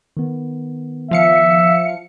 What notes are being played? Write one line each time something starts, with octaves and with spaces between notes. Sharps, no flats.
D#3 B3
F3 E5 F5 C#7